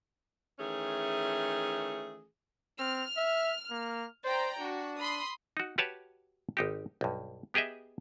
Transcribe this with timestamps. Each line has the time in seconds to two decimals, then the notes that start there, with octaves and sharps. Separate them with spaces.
0.59 D#3 E3 A3 C#4 G#4
2.79 C4 F6
3.17 E5
3.71 A#3
4.25 C5 D5 G5 A#5
4.60 D4 F#4
5.01 B5 C6 D#6
5.57 D#4 F#4
5.78 F#4 G4 B4 C#5 A5
6.57 G#1 D#4 G4
7.01 B1 G2
7.54 B3 G4 G#4 D#5 E5